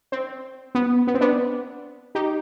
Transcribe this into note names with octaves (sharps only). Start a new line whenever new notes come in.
C4
B3
B3
C4
B3 D4
D#4 G4